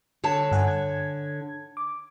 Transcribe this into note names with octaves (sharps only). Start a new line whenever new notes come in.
D3 C#5 A5
G2 F#5 G#5
G#6
D6